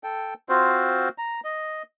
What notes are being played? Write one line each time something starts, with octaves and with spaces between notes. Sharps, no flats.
A4 G5
C4 F4 F#4 C5
A#5
D#5